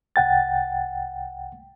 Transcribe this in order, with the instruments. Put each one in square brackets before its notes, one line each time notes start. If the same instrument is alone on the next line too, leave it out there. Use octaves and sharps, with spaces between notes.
[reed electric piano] C2 F#5 G5 A6